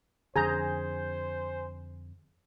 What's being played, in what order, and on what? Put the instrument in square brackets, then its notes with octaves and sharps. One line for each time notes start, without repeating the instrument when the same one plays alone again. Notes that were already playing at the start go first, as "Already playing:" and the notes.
[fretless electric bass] F2 D3 [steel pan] G#4 A#5 [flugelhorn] C5 [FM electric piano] G#5 G6